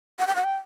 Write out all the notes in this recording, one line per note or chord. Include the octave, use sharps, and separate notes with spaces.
F#5
G5
F#5
G5